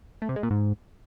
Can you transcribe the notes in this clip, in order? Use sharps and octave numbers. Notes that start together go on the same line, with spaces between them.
A3
C3
G#3
A#2
G#2